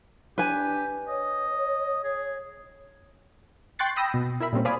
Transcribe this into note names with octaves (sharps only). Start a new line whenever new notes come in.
D4 G4 B4 G#5
C#5 D#5
G#4
G5 C6 C#6 F#6 A6 C7
G5 B5 D#6 E6 A#6
B2
E4 A#4 E5 B5
A#2 G3 C4 C#4
C5 D5 F5 G#5 B5 D#6